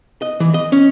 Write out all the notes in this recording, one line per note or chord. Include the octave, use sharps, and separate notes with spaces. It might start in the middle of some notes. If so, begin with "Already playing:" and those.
D#5
E3
D#5
C#4